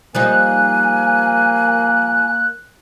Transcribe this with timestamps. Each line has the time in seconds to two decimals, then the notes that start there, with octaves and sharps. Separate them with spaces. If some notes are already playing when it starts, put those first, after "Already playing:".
0.15 F3 G3 A#3 D#4 G#5 F#6